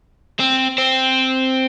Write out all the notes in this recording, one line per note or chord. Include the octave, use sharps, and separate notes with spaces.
C4
C4